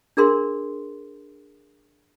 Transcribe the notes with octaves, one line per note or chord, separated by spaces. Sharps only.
D4 G#4 A#4 C6